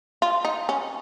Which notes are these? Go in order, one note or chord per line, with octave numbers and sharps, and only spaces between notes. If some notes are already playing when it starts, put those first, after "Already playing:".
F4
D#4
C#4